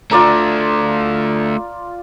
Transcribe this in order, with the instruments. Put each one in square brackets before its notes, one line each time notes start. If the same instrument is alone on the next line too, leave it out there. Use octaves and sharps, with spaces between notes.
[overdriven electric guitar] A3 D4 [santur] F4 D5 A#5